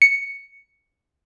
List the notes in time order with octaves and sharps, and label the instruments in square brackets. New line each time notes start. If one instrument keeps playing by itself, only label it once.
[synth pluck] C#7